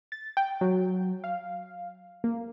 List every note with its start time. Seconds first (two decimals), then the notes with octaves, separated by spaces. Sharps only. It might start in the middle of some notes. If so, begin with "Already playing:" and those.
0.12 A6
0.37 G5
0.61 F#3
1.24 F5
2.24 A#3